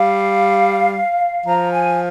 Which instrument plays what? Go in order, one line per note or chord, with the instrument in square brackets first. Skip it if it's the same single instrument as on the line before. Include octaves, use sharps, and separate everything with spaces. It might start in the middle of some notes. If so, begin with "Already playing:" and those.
Already playing: [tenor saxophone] G3 [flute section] F5
[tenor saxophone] F3 [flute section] A#5
[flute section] G#5